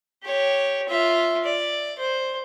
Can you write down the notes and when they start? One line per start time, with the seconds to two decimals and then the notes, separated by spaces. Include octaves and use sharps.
0.24 G4 C#5
0.89 F4 E5
1.44 D5
1.99 C5